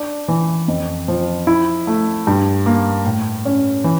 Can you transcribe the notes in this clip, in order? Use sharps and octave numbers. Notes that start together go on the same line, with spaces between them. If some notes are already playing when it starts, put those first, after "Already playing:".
Already playing: D4
E3
F2
F3
E4
A3
G2
A#3
A2
C#4
E3